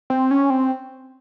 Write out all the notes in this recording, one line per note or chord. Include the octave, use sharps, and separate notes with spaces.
C4
C#4
C4